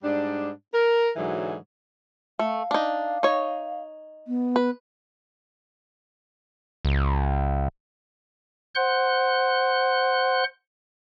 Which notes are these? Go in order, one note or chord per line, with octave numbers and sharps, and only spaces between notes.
G#2 G3 D4
A#4
G#2 D3 E3 F#3
A3 F5
D4 D#4
D#4 C#5
B3
B4
C#2
C5 F#5 C6 F#6